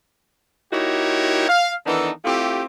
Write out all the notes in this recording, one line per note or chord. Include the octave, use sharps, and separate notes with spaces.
A#3 D#4 E4 F#4 G4 C#5
F5
D#3 E3 B3 D4 D#4 A4
A3 C4 E4 F4 G4